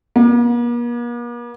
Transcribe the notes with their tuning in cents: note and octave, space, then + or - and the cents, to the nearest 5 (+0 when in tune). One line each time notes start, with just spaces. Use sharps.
A#3 +45